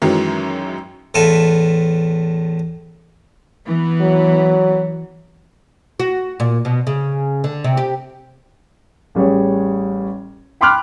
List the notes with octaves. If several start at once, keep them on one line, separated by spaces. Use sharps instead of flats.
F#2 D#3 E3 F#3 G#3
E2 A2 F4 A4 B4 E5
E3 B3
F#3
F#4
A#2
B2
C#3
D3
C3
G4
A1 G3 G#4 C#5
G5 B5 C6 D6 F6 F#6